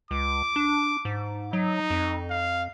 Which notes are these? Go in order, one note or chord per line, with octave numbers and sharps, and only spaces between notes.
C#2 D6
D4
G#2
F#3 D#4
F2
F5